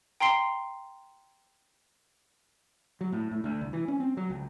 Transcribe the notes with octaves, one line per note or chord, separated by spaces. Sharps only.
G5 A#5 C6 C7 G7
F#3
A2
A2
D2
C2
E3
C#4
C4
F#3
C#2